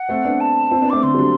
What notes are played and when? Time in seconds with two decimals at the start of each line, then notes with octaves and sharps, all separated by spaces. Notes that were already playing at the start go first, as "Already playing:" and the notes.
Already playing: F#5
0.09 A3 C4
0.25 B3 D4
0.40 A5
0.71 C4 E4
0.82 B3 D4
0.90 A3 C4 D6
1.03 D3 C6
1.14 G3
1.19 D3 F#3